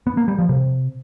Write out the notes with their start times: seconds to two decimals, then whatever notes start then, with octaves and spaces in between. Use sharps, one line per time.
0.07 B3
0.17 A#3
0.28 G3
0.38 F3
0.49 C3